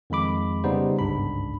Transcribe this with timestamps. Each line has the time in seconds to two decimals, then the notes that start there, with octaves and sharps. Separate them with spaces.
0.10 F2 D#3 G#3 B5 D6
0.64 C#3 G3 B3 D#4 C5
0.99 G1 C#2 G#2 D4 B5